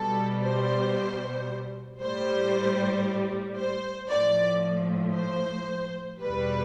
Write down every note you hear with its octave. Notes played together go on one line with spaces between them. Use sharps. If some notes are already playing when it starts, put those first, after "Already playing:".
Already playing: B2 G3 A4
C5
A2 G3 C5
C5
A2 F3 D5
C5
E2 B2 G3 B4